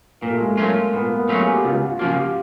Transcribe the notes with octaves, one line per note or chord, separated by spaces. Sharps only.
A#2 A#3
A3
G#3
A3
F#3 A3 A#3 C#4 F4
A#2 B3
A#3
B3
F#3 A3 C#4 F4
G#4
G4
F#4
C#2 F4
F#4
F4
C#3 F3 A#3 F#4
G4